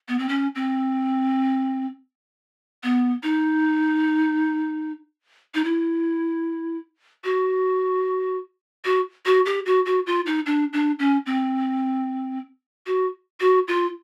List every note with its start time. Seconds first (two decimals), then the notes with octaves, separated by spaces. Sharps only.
0.08 B3
0.19 C4
0.29 C#4
0.55 C4
2.83 B3
3.23 D#4
5.54 D#4
5.64 E4
7.24 F#4
8.85 F#4
9.26 F#4
9.46 G4
9.66 F#4
9.86 F#4
10.06 F4
10.26 D#4
10.46 D4
10.73 D4
10.99 C#4
11.26 C4
12.86 F#4
13.40 F#4
13.68 F4